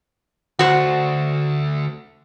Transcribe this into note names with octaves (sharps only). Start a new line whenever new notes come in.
D2 F#4 C5